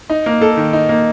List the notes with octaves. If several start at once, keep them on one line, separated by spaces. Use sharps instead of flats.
D#4
A#3
A4
D#3
D#4
A#3